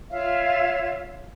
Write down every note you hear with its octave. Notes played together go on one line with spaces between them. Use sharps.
F4 C#5 E5 F5